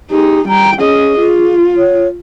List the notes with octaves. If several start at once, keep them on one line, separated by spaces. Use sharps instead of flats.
D#4 G4 G#4
G3 G5 A#5
C#4 G#4 D#5
F4
C#5